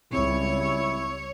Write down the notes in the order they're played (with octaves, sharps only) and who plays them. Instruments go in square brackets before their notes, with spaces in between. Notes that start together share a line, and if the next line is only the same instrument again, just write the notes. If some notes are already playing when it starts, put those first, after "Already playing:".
[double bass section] C#2 G3 [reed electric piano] C4 [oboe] E4 [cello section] C#5